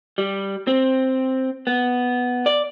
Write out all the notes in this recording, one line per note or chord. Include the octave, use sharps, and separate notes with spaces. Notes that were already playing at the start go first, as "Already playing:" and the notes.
G3
C4
B3
D5